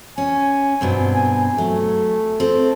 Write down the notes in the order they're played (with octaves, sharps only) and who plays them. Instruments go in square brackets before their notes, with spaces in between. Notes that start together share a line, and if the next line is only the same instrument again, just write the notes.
[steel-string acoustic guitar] C#4 [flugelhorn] G#5
[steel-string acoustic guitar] G2 B2 C4
[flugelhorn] G#5
[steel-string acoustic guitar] F#3 [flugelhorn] A3
[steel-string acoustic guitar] C4 A4